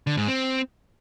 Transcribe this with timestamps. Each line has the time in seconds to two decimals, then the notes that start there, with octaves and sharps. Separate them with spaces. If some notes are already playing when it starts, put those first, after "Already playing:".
0.07 D3
0.17 G#2
0.28 C4